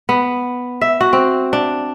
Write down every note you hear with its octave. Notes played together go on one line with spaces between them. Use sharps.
B3
E5
F#4
C4
D4